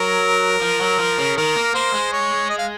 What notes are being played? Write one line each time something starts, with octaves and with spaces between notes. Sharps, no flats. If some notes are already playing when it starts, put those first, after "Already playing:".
Already playing: F#3 A#4
F3
F#3
F3
C#3
D#3 A#4
A#3
A#3 C5
G#3
C#5
D#5
F5